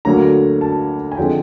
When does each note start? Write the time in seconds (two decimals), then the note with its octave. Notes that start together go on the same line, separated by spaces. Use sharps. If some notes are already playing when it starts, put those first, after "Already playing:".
0.05 D2 D3 F#3 A#3 A#5
0.61 A5
1.12 G#5
1.17 D3 F3 G#3 C4 G5